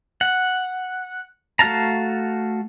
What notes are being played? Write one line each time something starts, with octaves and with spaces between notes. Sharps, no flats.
F#5
A3 F#4 F5 A5 A#5